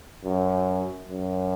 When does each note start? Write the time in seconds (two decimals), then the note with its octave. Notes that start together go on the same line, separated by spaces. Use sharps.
0.25 F#2
1.09 F#2